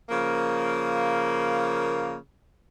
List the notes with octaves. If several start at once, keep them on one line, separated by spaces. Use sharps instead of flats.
C#3 F3 A#3